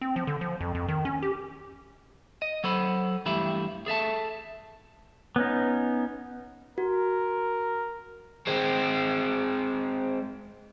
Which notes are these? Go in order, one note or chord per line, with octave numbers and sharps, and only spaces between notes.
C4
F3
D3
F3
F2
F2
D#3
C#4
G4
D#5
F#3 A4 C5 B5
G2 E3 A3 G4 E5 B5
G#4 A4 E5 A5
B3 C#4 D#4
F#4 A#4
G#3 C4